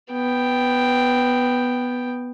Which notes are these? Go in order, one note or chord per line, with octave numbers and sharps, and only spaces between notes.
B3 G5